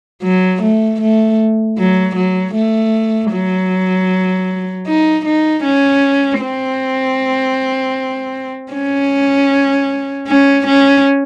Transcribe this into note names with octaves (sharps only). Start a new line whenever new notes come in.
F#3
A3
A3
F#3
F#3
A3
F#3
D#4
D#4
C#4
C4
C#4
C#4
C#4